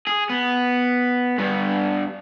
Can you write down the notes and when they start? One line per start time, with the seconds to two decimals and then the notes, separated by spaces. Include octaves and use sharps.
0.07 G#4
0.30 B3
1.38 G2 B3